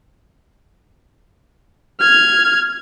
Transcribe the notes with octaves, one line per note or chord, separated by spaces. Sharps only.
F6 G#6